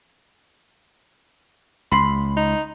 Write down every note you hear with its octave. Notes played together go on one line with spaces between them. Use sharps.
C#2 B5 C6
D#4